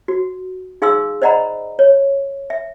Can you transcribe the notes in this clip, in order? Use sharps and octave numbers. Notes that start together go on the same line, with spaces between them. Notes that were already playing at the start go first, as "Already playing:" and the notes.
F#4
D#4 G#4 F5 C6 D6 E6
C5 D5 D#5 F#5 A#5 B5
C#5
E5